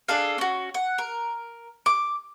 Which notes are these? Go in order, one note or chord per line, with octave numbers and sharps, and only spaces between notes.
D4 G#4 A4 F5
C#4 F#4
F#5
A#4
D6